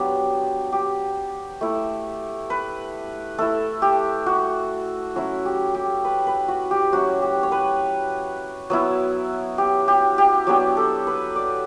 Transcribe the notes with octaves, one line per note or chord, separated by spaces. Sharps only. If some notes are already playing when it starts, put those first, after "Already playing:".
Already playing: F#3 B3 D4 G4
G4
A3 E4
B4
A3 E4 A4
G4
F#4
F#3 C#4 E4 F#4
G4
G4
B4
B4
F#4
G4
F#3 C#4 E4 F#4
G4
C#5
B4
F#3 B3 E4
G4
G4
G4
F#3 B3 D4 G4
A4
B4
D5